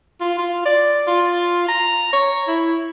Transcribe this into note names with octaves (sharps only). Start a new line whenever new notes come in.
F4
F4
D5
F4
A#5
C#5
E4